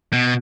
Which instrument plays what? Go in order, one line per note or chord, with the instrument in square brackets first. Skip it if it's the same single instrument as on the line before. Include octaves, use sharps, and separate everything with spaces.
[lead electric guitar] B2